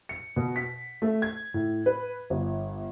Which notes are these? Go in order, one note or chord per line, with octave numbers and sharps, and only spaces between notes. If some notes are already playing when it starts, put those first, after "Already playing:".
C#7
B2
B6
A3
G#6
A2
B4
G1